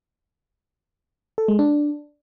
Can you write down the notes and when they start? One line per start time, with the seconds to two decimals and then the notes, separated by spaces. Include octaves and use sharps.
1.38 A4
1.48 G#3
1.59 D4